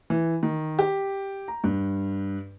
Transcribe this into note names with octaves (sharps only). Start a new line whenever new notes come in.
E3
D#3
G4
A#5
G2